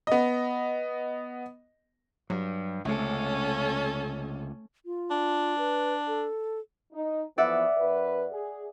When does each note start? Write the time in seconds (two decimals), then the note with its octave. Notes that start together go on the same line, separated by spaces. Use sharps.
0.07 B3 D#5
2.30 G2 F#3
2.85 C#2 C3 A3 C#4 A4
4.86 F4
5.11 D4
5.58 B4
6.07 A4
6.93 D#4
7.38 E3 F3 B3 D5 E5 F#5
7.78 F#2 B4
8.32 G#4